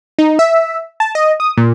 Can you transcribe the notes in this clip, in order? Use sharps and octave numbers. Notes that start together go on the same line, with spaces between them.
D#4
E5
A5
D#5
D#6
A#2